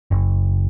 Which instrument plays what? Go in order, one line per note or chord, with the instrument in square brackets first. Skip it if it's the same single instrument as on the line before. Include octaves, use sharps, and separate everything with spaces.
[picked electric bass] F#1